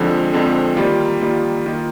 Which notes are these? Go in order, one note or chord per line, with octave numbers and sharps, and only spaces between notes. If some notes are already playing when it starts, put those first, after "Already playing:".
Already playing: F2 D3 F3 G#3 C4
F2 D3 F3 G#3 C4
D#3 G3 A#3 F4
D#3 G3 A#3 F4
D#3 A#3 F4